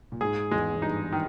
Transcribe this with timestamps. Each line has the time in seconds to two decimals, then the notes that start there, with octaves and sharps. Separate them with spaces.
0.12 A#2
0.21 G#2 G#4
0.51 E2 G#3
0.74 E2
0.82 G2 D#4
1.12 D#3